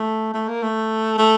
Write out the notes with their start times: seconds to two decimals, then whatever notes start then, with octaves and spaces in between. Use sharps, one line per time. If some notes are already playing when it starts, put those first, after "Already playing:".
Already playing: A3
0.34 A3
0.48 A#3
0.63 A3
1.18 A3